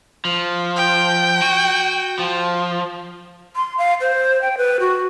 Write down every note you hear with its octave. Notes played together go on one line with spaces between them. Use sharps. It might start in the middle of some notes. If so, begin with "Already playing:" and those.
F3
G5
F#4
F3
C6
F5
C5
G5
B4
F#4